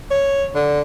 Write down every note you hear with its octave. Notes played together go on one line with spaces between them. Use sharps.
C#5
D3